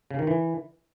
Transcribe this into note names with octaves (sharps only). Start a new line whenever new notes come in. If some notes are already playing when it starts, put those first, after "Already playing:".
C#3
D#3
E3